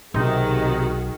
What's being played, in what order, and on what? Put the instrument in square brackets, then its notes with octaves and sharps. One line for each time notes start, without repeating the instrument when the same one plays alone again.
[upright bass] B1 [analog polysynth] C3 D#4 [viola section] D#3 F#4 G#4